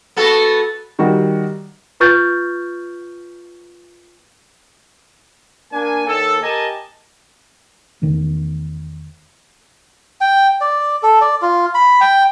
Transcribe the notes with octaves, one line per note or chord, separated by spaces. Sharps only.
B3 F#4 A4
D#3 G3 F#4
F4 B4 C#6 F6 G6 A6
A#3 D4 G#5
D#2 A4
G4 A#4 D#5 G#5 A5
E2 D#3 A3
G5
D5
A4
D5
F4
B5
G5